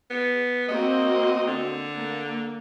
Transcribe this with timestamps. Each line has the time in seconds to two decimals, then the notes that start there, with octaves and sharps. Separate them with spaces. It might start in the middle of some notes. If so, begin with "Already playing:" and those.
0.10 B3
0.68 A#3 C4 F#4 D#5
1.47 D3
1.96 A#3